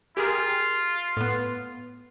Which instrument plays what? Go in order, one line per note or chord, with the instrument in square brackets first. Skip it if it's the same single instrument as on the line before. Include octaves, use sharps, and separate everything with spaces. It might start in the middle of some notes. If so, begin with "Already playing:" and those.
[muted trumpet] F4 [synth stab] G4 G#4 A#4
[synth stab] A2 B3